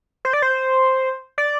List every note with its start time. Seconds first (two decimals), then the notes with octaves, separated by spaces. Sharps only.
0.25 C5
0.33 D5
0.42 C5
1.38 D5